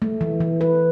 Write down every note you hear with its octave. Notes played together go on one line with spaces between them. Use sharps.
A3
E3
E3
B4